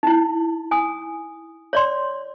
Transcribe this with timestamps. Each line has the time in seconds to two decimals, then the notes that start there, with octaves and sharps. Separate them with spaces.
0.03 D#4 E4
0.71 G#5 D#6
1.73 C#5 D5 C6